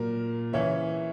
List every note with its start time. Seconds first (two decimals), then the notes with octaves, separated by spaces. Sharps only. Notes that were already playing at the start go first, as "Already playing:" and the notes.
Already playing: A#2 F#3 A#4
0.53 C#3 E3 C#5 E5